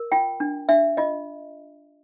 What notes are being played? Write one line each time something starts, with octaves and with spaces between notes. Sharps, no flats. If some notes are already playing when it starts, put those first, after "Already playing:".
Already playing: A#4
F4 G5
D4
D4 E5
F4 D#5